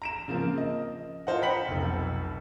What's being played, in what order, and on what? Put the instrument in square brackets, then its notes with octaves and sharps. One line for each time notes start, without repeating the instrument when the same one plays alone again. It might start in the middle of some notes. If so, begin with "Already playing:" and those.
[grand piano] A#5 D7 E7
C#3 F3 A#3 C4
D#5
F4 C5 D#5 F#5
G5 A#5 B5 B6 C#7 F#7
F1 B1